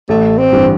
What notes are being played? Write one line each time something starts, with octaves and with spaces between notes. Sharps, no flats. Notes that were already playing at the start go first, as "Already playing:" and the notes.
A1 A3
C4
G2 E3